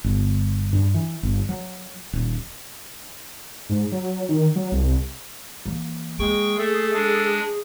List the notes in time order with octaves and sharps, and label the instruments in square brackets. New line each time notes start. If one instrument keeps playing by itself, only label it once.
[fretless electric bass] G1
G2
E3
G1
F#3
D#1
[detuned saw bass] G#2
F#3
D#3
F#3
C2
[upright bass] E3 A#3
[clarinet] G#3 [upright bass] A#3 [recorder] G#4 [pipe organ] G5 C#6
[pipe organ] A3 [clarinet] A4
[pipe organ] G#3 D4